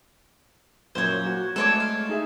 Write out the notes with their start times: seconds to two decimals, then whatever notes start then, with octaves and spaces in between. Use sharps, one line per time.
0.95 F#2 A#2 F#3 C5 C#5
1.26 F#4
1.56 G#3 A3 A4 C#5 D5
1.80 F5
2.09 D#4 G#4 E5